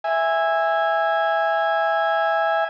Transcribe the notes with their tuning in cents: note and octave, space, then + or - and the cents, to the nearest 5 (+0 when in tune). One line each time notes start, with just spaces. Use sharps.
E5 +0 G#5 -15